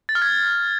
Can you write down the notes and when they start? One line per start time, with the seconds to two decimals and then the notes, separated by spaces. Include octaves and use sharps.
0.09 A6
0.15 F6
0.22 G#6